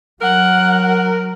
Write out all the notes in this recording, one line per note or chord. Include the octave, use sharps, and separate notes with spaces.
F#3 A#4 F#5